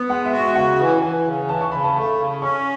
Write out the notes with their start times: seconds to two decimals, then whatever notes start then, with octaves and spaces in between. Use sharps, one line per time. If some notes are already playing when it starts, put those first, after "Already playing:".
Already playing: B3
0.09 G#3 F#5
0.25 E5
0.32 F#4
0.40 E5
0.55 C#3 F#5
0.79 E3
1.02 E3 G#5
1.25 C#3
1.49 E3 A5
1.61 C#6
1.72 C#3 B5
1.84 A5
1.95 A3 B5
2.18 C#3
2.42 C#4 C#6